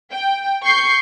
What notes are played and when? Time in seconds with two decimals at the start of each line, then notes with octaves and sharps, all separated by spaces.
0.12 G5
0.64 C#6 G6 C7